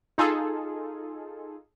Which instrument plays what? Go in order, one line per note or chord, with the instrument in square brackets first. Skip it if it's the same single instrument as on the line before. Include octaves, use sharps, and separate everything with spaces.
[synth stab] D#4 F4 G#4 A4